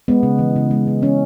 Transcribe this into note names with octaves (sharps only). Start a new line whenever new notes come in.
G#3 B3
C#3
E3
C#3
G#3
C#3
E3 C#4